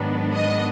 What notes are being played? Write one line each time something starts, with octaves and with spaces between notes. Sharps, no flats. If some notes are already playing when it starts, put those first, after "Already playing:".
Already playing: G#2 D#3 F#3 B3 D4
D#5